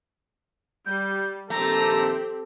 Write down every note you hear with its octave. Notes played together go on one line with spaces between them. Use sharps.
G3 G6
A#1 D#3 A3 C4 G4 A4 A#5